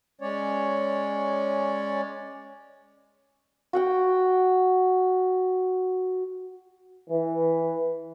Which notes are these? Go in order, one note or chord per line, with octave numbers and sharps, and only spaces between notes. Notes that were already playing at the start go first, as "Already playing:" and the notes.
G#3 C#4 C#5 D5
F#4 F#5 G5
E3